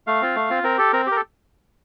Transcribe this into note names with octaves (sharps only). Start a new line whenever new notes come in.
A3 F5
C4 F4
A3
C4 F4
C4 A#4
G4 A4
C4 A#4
G4 A#4
A4